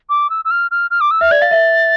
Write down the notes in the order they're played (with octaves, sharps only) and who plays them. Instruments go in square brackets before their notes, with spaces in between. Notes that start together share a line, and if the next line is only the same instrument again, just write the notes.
[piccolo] D6
E6
E6
F6
F6
F6
D6
E6
[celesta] E5 [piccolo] F6
[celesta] D5 [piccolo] G#6
[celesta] F5 [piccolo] A6
[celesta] E5